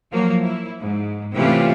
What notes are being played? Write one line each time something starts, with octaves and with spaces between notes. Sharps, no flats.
F3 F#3 A#3
E4
G#2
C3 E3 A3 C#4 F4 G4